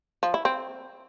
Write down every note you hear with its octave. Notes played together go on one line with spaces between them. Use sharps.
F3
E4
C4